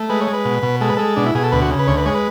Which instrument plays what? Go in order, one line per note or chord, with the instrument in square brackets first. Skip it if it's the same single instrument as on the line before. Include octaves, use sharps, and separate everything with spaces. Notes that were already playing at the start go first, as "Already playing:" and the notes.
Already playing: [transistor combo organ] A3
G#3 B4
C#5
G#3
B4
B2
B2
G#3 A4
B4
G#3 A4
B2 D4
E4
B2 G#4
A4
D2 B4
F#4
C#3
B4
D2 C#5
B4
G#3 C#5
B4